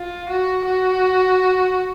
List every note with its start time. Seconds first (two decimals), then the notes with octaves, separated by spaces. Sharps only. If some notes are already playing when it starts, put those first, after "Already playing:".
Already playing: F4
0.29 F#4
0.65 F#4